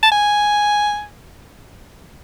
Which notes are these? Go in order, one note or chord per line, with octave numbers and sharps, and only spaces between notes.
A5
G#5